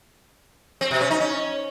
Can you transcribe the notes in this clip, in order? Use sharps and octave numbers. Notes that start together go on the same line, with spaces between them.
C4
B2
C#4
D#4
C#4